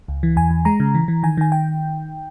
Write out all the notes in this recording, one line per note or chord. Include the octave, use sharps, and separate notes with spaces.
C#2
E3
E2 G#5
E2
G#3 A#5
C#3
E3
E3
D#3 G#5
D#3 G#5
G5